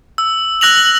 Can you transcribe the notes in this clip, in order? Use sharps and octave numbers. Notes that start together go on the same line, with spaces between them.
E6
E6 F#6 A#6 F7 F#7